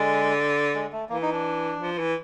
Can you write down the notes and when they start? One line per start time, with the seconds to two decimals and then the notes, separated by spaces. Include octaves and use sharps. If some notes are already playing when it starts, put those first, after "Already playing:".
Already playing: D3 G#3
0.74 G#3
0.92 A3
1.09 E3 A#3
1.22 D#4
1.33 D4
1.80 F3
1.98 E3